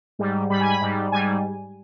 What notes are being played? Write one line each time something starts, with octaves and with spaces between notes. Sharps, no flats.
G#2 G3
G#2 G3 B5
G#5
B5
G#2 G3
G#2 G3 G#5